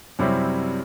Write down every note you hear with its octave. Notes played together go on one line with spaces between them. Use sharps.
F#2 C3 F#3 G3 C4 E4